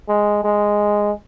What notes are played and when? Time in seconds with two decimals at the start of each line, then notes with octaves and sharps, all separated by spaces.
0.09 G#3
0.44 G#3